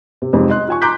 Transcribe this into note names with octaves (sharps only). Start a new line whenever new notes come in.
C3
F2 C3 G3 G#3 D#4
D#5 C6 F#6
F4 G#5 C#6
A#5 C6 D6 F#6 G6 B6